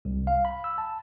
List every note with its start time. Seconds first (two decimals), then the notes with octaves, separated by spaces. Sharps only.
0.05 C2
0.27 F5
0.45 B5
0.64 E6
0.78 A5